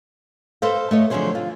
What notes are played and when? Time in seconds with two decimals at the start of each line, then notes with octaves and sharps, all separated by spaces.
0.62 A4 B4 C5 D#5 F5
0.91 A3 C#5 D#5
1.10 D3 F3 F#3 G#4 C5 C#5
1.35 F4